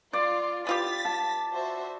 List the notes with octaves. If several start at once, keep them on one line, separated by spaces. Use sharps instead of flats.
F4 D5
B3 F4 G4 A6 B6
A5
F#4 C5 E5